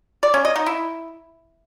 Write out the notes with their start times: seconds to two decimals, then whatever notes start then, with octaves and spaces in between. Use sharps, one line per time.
0.23 D5
0.34 C#4
0.45 D#5
0.56 D#4
0.66 E4